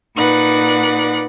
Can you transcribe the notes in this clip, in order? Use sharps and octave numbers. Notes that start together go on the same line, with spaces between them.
A#2 D#4 B4 D5 F#5 F#6